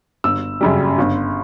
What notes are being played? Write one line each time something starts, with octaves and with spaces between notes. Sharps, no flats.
G1 E6
F#2 C#3 G3
G1